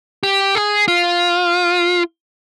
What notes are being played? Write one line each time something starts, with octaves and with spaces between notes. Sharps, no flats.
G4
G#4
F4